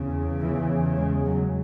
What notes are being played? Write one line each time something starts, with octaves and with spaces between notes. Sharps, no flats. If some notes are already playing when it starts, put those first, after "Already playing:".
Already playing: E2 C#3
E3
G#3
F#3